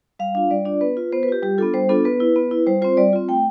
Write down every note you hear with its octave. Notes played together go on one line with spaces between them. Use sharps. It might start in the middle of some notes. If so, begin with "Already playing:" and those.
G3 F5
D4 F4 F5
G3 D5
D4 F4 D5
B3 B4
F4
B3 C5
B4
F4 G4
G3 G4
B3 D4 F4 A4
G3 C5
B3 D4 F4 A4
B3 B4
E4
B3
E4
G3 C5
C4 F4 C5
G3 D5
C4 F4
A3 G5